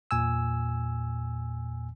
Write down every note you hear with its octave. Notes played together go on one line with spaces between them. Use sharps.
E2 A#2 G#5 E6